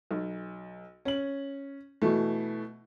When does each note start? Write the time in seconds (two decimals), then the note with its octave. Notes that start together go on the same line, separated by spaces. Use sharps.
0.11 B1
1.05 C#4 F#7
2.02 B2 E3 A3